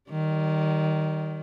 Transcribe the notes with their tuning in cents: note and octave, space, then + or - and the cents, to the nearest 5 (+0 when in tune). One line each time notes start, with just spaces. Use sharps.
D#3 +0 G3 -35